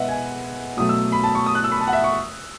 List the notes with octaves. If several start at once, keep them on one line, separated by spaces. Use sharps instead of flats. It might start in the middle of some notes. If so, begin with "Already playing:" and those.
Already playing: B2 G#3 B4 D#5 E5 F#5
G#5
B2 F#3 A3 D#6
E6
B5
A5
C#6
D#6
F#6
E6
B5
A5
F#5
E5
C#6